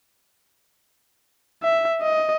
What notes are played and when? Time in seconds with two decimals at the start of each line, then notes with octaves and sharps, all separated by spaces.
1.63 E5
2.02 D#5